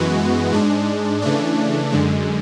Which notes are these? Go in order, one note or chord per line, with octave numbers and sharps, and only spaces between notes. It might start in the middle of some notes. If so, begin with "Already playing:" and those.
Already playing: F#2 E3 G#3 B3 F#4
G#2 G#3 D4
C#3 E3 A3 D4
F#2 D3 G#3